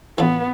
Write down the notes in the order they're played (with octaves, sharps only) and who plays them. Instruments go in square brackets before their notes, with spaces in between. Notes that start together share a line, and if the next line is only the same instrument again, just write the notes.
[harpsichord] A2 E3 A3 D4 F4 [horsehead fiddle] B3